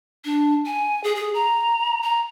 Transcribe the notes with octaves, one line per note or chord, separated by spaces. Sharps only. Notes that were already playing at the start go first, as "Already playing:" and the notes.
D4
G#5
G#4
G#4
A#5
A#5